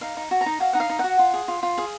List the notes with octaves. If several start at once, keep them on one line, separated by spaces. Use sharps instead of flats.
D#4 F5
D#4
F#4
A#5
D#4
F#4 F5
D#4 F#5
F5
D#4
F#4 F#5
F4
G#4
F4
F4
G#4 F5